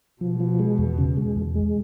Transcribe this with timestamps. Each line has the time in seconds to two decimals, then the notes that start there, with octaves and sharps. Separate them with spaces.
0.21 B2 F3
0.40 F3
0.59 G#3
0.78 E2
0.98 C#3
1.17 G#3
1.36 E2
1.55 G#3